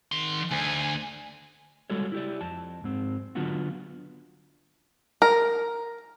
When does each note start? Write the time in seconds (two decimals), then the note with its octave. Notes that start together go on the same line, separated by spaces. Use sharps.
0.12 D#3 C6
0.51 D2 G#5
1.90 G3 G#3 F#4 A4 C#5
2.12 E4 G4 D5
2.41 F2 A5
2.84 G#2 C4
3.35 D3 F#3 B3 D4 F4 F#4
5.22 A#4